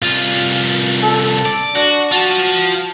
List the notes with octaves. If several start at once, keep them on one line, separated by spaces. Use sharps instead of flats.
C2 F4
A4
D5
D4 F#4
F4 F#4 A5